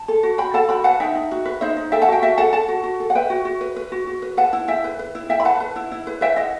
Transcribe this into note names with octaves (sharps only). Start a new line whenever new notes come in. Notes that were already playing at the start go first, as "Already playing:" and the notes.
Already playing: A5
A4
F#4
F#4 G5 B5
A4 F#5 A5
F#4 G5 B5
B4 F#5 A5
D#4 E5 G5
D#4
F#4
B4
D#4 C5 E5
D#4
A4 E5 G5
F#5 A5
F#4 E5 G5
F#4 E5 G5
A4 F#5 A5
A4 F#5 A5
F#4
F#4
A4
F#5
B4 E5 G5
F#4
F#4
B4
B4
F#4
F#4
B4
B4 F#5 A5
E4
E4 E5 G5
B4
B4
E4
E4 E5 G5
B5
B4 F#5 A5
B4
E4
E4
B4
B4 E5 G5
E4 D#5 F#5